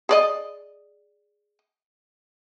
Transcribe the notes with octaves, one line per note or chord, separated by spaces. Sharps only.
G#4 D5 D#5